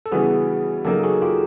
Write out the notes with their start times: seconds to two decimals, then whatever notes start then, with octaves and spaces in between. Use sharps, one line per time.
0.06 A4
0.12 C#3 E3 G3 B3 F#4 G#4
0.85 C#3 F#3 A#3 D#4 G4 A4
1.03 F#4 G#4
1.22 F4 G4